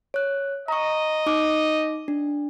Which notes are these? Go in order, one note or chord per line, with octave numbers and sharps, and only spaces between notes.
C#5 F#6
D#5 A#5 C#6
D#4 D6
D4